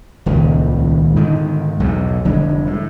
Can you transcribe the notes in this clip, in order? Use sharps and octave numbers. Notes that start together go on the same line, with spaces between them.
D#1 C#2 D#3
G#2 D3 D#3
B1 E2 A2
F1 D3 G3 G#3
A2